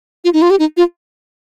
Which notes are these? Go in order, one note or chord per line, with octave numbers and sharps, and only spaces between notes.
F4
D#4
F4
G4
D#4
F4